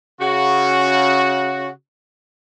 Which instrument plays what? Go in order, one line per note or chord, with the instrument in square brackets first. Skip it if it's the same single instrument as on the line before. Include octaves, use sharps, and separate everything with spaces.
[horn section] C#3 F#4